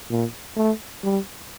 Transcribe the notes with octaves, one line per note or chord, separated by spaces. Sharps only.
A#2
A3
G3